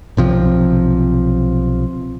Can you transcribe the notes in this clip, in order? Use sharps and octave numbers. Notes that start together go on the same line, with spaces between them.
B1 C3 F3